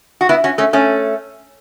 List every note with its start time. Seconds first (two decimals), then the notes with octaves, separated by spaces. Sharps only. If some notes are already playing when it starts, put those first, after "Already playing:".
0.21 F#4
0.29 B3 E4
0.44 C#4 F#4
0.58 A3 C#4
0.73 A3 C#4